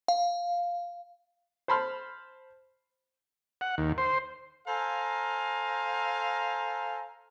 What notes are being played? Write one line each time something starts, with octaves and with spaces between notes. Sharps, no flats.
F5
C5 A5 B5 C6 F6
F#5
D#2
C5
A4 C5 F5 G#5 A#5